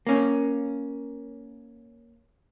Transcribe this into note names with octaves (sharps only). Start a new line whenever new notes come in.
A#3 C#4